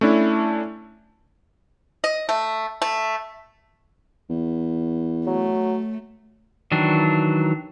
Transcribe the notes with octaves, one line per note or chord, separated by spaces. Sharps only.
A3 C#4 D4 E4
D#5
A3
A3
E2
F#3 A3
D#3 E3 F#3 D4